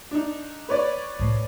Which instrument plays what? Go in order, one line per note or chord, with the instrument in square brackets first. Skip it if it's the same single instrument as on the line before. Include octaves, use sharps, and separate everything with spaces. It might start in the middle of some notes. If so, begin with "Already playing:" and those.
[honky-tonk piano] D4 D#4
B4 C#5 D5
[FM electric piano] C2 A2